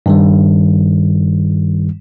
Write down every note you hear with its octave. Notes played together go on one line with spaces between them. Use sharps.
G2 D#3 G3